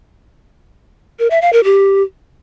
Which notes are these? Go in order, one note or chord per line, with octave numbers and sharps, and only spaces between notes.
A#4
E5
F5
A#4
G4